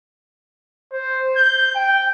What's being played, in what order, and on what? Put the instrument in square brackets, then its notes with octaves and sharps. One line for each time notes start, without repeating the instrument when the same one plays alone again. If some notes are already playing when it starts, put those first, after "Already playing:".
[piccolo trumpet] C5
G6
G5